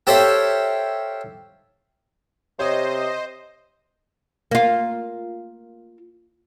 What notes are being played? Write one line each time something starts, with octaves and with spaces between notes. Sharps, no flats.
G4 A4 C5 C#5 E5 F5
C3 C5 C#5 D#5
A#3 F4